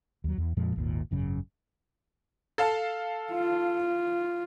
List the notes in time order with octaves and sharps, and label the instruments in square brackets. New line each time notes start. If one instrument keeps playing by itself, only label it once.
[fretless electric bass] D#2 F#3
E2
F2 A#2 F3 G#3
G#1 D#2 A#2
G#1 F#2 C#3
[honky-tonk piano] A4 F5 A5
[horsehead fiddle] F4